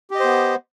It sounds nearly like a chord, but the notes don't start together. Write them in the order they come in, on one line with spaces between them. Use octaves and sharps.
G4 D#5 C5 B3